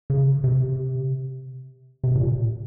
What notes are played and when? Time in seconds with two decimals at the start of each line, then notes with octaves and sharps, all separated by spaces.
0.10 C#3
0.44 C3
2.04 C3
2.15 A#2